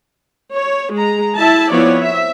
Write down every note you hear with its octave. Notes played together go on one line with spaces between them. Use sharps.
C#5
G#3 A#5
E4 E5 A5
F3 B3 C4 E4 C#5 D5
E5